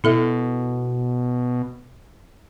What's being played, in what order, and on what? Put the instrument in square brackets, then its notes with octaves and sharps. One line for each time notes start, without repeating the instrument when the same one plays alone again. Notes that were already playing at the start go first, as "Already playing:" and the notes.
[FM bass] B2 [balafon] E4 A4 E5